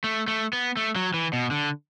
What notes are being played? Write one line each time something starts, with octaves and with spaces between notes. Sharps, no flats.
A3
A3
B3
A3
F#3
E3
B2
D3